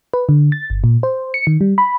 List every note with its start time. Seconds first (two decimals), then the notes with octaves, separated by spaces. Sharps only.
0.14 B4
0.29 D3
0.52 A6
0.70 G1
0.84 A#2
1.03 C5
1.34 C#7
1.47 D#3
1.61 G3
1.78 B5